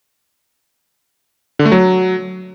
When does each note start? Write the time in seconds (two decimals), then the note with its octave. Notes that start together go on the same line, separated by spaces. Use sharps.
1.59 D3
1.66 A3
1.72 F#3